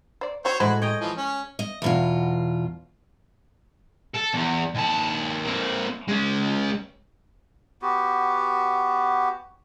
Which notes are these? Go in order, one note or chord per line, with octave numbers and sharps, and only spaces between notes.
C5 D5
C4 F#4 C5 C#5
A2 G#3 F#4 C5 B5
C#5 D#5 G5 A#5
E3 F3 D#5
C#4
D#5
E2 B2 F4
A4
E2
D#2 A5
A#3 C4
G#3 C#4
B3 F#4 G4